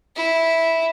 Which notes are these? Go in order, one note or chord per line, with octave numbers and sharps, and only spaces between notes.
E4